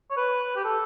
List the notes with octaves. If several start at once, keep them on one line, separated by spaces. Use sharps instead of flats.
C#5
B4
G4
A4